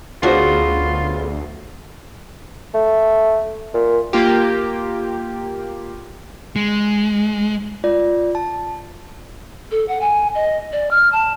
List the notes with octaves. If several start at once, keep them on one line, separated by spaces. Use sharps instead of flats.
D2 C#3 B3 D4 F4 F#4 A4 C5
A3
A#2
A#3 F4 G4
G#3
F4 D5
A5
A4
F#5
G#5
D#5
D5
F6
A5